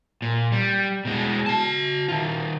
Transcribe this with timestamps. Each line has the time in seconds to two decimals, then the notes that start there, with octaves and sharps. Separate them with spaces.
0.22 A#2
0.52 G3
1.05 B2 G#3
1.46 F#4 A5
2.08 D#3 F4